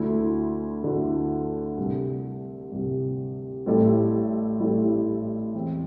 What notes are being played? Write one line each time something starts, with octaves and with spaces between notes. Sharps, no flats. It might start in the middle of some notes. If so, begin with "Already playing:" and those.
Already playing: D2 D3 A3 E4
D2 D3 A3 E4
C2 C3 G3
C2 C3 G3
A1 A2 G3 E4 A4
A1 A2 G3 E4 A4
E1 E2 E3 C4